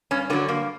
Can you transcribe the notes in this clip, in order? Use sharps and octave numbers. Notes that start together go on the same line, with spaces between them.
G2 C#4
D3 F#3 B3
G2 A#3